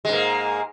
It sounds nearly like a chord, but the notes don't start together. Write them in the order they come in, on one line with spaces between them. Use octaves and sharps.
G#3 G#2 A#3